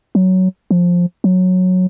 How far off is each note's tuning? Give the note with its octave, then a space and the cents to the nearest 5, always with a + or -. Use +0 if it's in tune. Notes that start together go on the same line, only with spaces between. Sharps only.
F#3 +10
F3 +10
F#3 -10